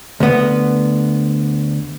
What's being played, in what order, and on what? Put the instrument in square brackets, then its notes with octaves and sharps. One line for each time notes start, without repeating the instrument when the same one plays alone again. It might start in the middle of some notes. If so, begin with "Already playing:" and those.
[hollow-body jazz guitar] D2 B3